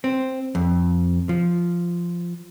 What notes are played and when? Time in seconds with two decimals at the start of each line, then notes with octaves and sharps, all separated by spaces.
0.04 C4
0.55 F2
1.29 F3